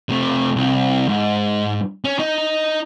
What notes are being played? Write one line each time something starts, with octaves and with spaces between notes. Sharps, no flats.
C3 A3
C2
G#2
C#4
D#4